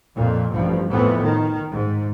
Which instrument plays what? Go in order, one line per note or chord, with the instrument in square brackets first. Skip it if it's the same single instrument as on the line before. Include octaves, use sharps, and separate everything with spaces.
[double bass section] F2 A#2
A1 G2 F3
F2 A2 E3 B3
D#3
G#2